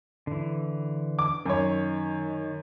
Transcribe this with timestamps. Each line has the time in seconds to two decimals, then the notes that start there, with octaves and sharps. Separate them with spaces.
0.27 D3 E3
1.19 D6
1.45 F#2 D#3 C#5